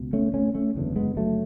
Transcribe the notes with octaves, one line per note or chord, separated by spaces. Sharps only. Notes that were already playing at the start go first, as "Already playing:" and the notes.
Already playing: C#2 B2
A3 C#4
A3 C#4
A3 C#4
F#1 E2 D3
G#3 B3
F#3 A3